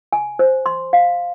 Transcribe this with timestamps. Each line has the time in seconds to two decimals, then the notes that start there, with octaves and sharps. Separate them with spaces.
0.13 G#5
0.39 C5
0.66 C6
0.93 F5